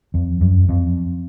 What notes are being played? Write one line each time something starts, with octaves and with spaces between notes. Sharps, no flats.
F2
F#2
F2